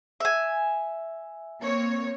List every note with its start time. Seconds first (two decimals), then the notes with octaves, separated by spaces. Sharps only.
0.20 E5 G#5
1.62 A#3 C4 C#5